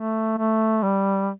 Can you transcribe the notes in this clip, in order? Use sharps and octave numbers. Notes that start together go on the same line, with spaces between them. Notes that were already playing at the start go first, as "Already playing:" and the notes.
Already playing: A3
A3
G3